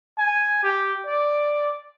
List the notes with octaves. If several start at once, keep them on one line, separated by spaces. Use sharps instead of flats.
G#5
G4
D5